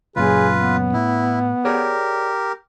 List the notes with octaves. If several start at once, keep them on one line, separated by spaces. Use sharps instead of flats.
C#2 F#2 A#2 F4 G#4 B4
B3
A2 E4
G4 G#4 A#4 C#5 D5